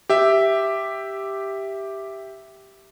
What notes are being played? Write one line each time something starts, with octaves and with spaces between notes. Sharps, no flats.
G4 E5